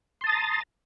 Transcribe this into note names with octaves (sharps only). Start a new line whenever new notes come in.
A5 A#5 C6 D#6 A6